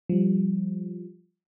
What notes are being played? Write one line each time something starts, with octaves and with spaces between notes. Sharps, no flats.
F3 G3